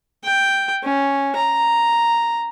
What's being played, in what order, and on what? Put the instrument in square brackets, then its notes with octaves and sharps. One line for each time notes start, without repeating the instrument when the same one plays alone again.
[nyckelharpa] G5
C#4
A#5